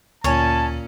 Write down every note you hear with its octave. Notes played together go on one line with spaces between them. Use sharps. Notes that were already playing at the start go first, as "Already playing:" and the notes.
D2 A#2 C#4 C#5 G#5 A5